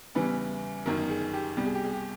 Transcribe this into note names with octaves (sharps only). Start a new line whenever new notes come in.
E2 C#3 E3 G3 B4
G1 F#2 D#3 A#4
G#4
G4
C2 B2 G3 G4
G#4
G4
G#4
G4